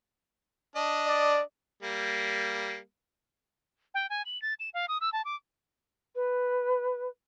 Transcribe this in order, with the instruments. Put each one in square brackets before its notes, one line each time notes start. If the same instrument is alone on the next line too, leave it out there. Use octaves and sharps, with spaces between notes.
[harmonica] D4 D#5
[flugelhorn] D5
[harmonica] G3 A#3
[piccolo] G5
G#5
F#7
A6
E7
F5
D#6
E6
A5
D6
[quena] B4